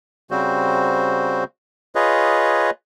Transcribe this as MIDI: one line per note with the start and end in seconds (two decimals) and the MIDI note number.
0.31 1.44 49
0.31 1.44 55
0.31 1.44 60
0.31 1.44 66
0.31 1.44 72
1.95 2.70 65
1.95 2.70 68
1.95 2.70 71
1.95 2.70 73
1.95 2.70 75